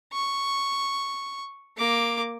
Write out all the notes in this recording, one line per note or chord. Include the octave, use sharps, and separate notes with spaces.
C#6
A#3 D6